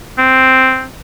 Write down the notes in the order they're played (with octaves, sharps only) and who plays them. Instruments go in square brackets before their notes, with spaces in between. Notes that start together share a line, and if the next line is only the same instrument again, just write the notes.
[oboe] C4